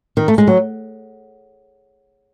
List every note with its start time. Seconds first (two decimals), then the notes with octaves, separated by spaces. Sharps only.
0.17 D#3
0.28 A3
0.38 G#3
0.47 F#3